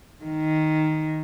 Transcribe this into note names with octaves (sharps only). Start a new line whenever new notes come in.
D#3